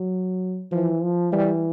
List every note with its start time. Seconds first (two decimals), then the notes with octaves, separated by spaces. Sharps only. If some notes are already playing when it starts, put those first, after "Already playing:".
Already playing: F#3
0.72 E3 F3
1.03 F3
1.32 E3 G3